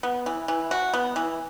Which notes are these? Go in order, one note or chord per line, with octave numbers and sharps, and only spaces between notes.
B3
E3
E3
F#4
B3
E3